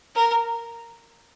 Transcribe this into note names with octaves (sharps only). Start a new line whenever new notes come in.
A#4